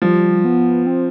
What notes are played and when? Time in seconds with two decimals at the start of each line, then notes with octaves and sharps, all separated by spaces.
0.02 F3 G3
0.45 B3
0.87 C4